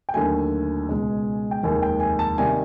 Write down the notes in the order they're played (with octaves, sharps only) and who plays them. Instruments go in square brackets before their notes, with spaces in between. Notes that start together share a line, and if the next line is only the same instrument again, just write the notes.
[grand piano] G5
D#2 D3 F#3 A3 G#5
C#2 B2 G#3
G5
F1 D#2 D#3 G#3 G#5
G5
G#5
A5
C3 D#3 G3 G#5